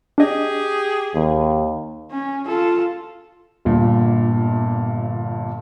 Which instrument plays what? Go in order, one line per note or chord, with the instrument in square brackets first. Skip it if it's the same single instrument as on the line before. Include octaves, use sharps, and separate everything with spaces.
[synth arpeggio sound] D4 D#5 [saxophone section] G4 G#4
[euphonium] D#2
[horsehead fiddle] C#4
F4 A4
[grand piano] G1 G2 A#2